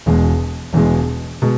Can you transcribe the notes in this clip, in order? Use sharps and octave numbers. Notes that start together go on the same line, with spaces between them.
E1 E2 B2 G#3
E1 E2 B2 G#3
B2 G#3